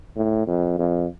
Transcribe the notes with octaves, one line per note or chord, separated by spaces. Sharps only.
A2
F2
F2